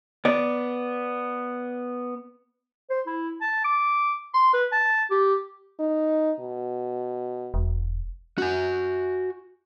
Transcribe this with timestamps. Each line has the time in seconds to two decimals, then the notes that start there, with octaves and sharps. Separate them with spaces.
0.25 B3 D5
2.90 C5
3.07 E4
3.41 A5
3.64 D6
4.34 C6
4.53 B4
4.72 A5
5.10 G4
5.80 D#4
6.40 B2
7.54 E1
8.38 F#4 G#5